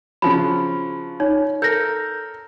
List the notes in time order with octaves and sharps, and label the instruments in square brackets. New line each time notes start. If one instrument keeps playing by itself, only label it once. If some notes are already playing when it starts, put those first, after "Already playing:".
[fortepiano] C#3 F3 F#3 [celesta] B5
[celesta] D#4 C#5
[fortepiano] A4 A#4 [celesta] G6 A#6